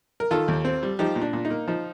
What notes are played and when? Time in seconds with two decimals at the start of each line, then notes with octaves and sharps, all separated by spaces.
0.20 A#4
0.31 D#3 F4 A4
0.48 D#2
0.65 C4
0.83 G3
0.99 F3 D#4 G4
1.16 A#2
1.22 D4
1.33 A#2
1.45 D#4
1.50 A#3
1.68 F3 D#4